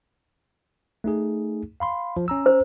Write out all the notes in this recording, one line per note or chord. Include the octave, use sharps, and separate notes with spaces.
A3 D#4 G#4
F5 B5 C6
F3
C#4 A#5 E6
C5